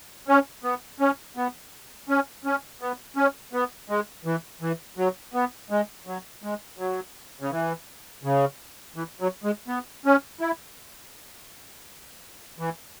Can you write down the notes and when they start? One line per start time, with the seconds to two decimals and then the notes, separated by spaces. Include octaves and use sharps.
0.28 C#4
0.64 B3
1.00 C#4
1.37 B3
2.09 C#4
2.45 C#4
2.81 B3
3.16 C#4
3.53 B3
3.89 G#3
4.25 E3
4.61 E3
4.97 F#3
5.34 B3
5.70 G#3
6.07 F#3
6.43 G#3
6.78 F#3
7.40 C#3
7.51 E3
8.23 C#3
8.96 E3
9.20 F#3
9.44 G#3
9.68 B3
10.05 C#4
10.41 E4
12.59 E3